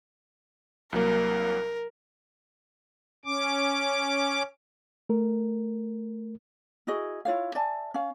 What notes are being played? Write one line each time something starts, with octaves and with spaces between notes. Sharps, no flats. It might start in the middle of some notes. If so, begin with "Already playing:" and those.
C2 F#3 A#3 A#4
C#4 D6
A3 A#4
E4 F#4 G#4 D#5
E4 F4 C#5 F5
D5 E5 G#5 A5
C#4 F5